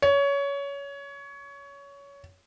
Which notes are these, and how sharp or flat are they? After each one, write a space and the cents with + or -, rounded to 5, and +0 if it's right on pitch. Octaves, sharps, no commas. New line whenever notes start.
C#5 +20